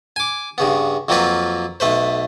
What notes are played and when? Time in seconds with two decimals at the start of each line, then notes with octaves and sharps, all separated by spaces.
0.16 G#5 D6
0.58 G2 C#3 B3
1.09 F2 F#3 A#3 C4 F4 B4
1.80 B1 A3 B4 C5